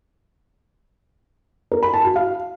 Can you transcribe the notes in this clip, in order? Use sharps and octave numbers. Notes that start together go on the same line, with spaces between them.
A#4
B5
A5
F#4
F5